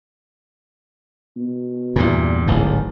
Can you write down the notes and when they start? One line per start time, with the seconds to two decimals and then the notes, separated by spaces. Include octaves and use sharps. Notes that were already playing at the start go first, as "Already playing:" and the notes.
1.36 B2
1.96 E2 G2 A#2
2.47 D1 A1 G#2